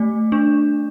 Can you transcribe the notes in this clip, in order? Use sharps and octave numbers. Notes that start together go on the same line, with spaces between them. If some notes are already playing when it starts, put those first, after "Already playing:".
Already playing: A3 D5
D4